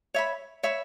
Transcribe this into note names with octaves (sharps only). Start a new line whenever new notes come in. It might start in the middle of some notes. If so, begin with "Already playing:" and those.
C#5 E5 B5
C#5 E5 B5